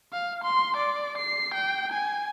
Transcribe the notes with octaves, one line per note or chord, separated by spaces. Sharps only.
F5
C6
D5
C7
G5
G#5